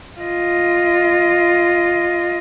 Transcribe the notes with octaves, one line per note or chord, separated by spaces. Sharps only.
F4 D#5